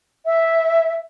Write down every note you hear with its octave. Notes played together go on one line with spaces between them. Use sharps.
E5